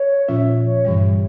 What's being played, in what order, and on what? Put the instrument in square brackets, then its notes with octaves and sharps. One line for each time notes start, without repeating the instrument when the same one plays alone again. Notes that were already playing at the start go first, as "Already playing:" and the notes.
Already playing: [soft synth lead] C#5
[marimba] A#2 F3 C#4 F4 [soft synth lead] E5
[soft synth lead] C#5
[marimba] G2 E3 G3